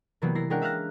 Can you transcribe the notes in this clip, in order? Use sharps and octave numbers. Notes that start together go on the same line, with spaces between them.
C3 E3 F#3 G3 A#3 B3
E4 A#4 A#6 C7
G#3 C#4 D4 A#4 F#5 G5
E5 F5 F6 F#6 A#6